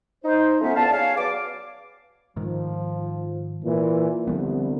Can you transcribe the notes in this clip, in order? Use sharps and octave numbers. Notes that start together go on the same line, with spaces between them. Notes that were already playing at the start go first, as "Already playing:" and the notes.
D#4 C5
F3 A3 B3 C#4 F4 E5
E2 D4 F5 A5
G#4 C#5 F5
F#3 B3 D5 D6
G#2 D#3 F3
A#2 E3
C2 D3 F3 B3